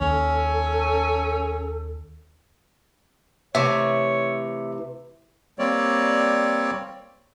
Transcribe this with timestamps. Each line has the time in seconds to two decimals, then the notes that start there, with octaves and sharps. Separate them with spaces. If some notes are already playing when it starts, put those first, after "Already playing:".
0.01 D#2 C#4 A4
3.55 C3 E3 A3 C#5 E5
5.59 G3 A#3 C4 C#5 D5